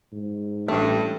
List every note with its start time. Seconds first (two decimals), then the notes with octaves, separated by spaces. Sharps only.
0.12 G#2
0.68 A1 G2 A3